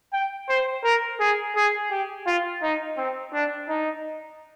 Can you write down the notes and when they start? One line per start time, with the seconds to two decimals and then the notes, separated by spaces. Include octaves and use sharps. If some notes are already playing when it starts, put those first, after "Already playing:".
0.13 G5
0.49 C5
0.84 A#4
1.20 G#4
1.56 G#4
1.91 G4
2.27 F4
2.63 D#4
2.97 C4
3.33 D4
3.69 D#4